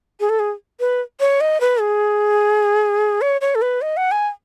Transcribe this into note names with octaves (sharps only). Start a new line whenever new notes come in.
G#4
A4
G#4
B4
C#5
D#5
B4
G#4
C#5
C#5
A4
B4
D#5
F#5
G#5